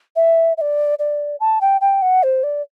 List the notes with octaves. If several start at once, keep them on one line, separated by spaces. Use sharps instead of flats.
E5
E5
D5
D5
A5
G5
G5
F#5
C5
D5